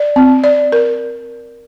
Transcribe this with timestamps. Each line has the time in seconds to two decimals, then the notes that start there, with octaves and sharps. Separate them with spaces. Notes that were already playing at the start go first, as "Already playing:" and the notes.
Already playing: D5
0.16 C4
0.44 D5
0.72 A#4